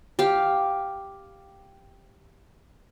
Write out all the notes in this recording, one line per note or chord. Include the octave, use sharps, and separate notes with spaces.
G4 F5